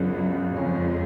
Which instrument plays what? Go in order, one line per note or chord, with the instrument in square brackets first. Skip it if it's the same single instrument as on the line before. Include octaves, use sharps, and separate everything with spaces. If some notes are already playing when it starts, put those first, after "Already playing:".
Already playing: [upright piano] C#2 C#3 F3 B3 D4 [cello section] F#2
[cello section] F2 [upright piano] C#3 G#3 C#4